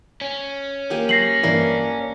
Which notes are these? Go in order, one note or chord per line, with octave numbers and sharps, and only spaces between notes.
C#4
A#3 G4 G#4 G#5
F#3 A#6 C7 F#7
G2 E3 A#3 D4 E4